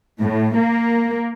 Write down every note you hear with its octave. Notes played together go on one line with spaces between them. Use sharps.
A2
A#3